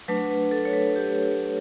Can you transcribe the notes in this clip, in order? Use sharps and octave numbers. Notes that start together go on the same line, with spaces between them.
F#3 A3 D4 B4
B4
A4
C#5
B4
G4